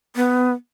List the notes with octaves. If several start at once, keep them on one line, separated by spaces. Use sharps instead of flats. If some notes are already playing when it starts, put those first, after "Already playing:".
B3